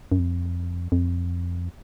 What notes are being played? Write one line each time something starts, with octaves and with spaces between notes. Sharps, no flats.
F#2
F2
F2